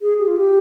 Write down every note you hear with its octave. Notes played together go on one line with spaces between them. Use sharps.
G#4
G4
F4
G4